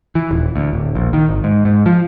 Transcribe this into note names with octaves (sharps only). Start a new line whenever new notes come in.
E3
D#1
D2
D1
A#1
D#3
G#1
G#2
G#2
F3